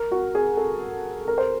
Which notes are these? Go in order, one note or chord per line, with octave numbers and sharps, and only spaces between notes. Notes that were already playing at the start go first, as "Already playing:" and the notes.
Already playing: A#4
F#4
G#4
A4
A#4
C5